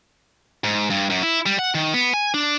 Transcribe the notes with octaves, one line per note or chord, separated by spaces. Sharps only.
G#2
G2
F#2
E4
G3
F#5
D#3
B3
G#5
D4